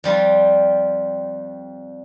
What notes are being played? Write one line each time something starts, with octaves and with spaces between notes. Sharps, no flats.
F2 G3 F4